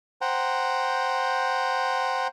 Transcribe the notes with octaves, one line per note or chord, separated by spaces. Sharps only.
C5 F#5 G5 A#5